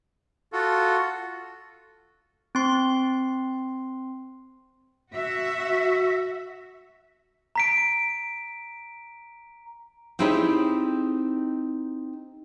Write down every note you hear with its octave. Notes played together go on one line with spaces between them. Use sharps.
F4 F#4 A4
C4 C6
F#4 E5
A#5 B6 D7
C4 D#4 E4 G4 G#4 C#5